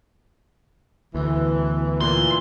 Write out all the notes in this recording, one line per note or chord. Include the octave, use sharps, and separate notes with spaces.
D2 B2 E3
A#2 E3 C6